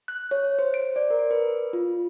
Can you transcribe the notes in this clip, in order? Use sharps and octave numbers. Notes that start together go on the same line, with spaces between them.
F#6
C#5
C5
D7
D5
A#4
B4
F4